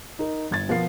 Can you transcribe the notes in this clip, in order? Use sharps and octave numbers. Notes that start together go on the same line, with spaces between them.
D#4 A#4
G1 G#6 A6
B2 F3 B3 A#4 F5 C7